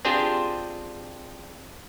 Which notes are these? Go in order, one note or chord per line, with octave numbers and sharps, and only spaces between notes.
C4 D4 F4 G4 G#4 C5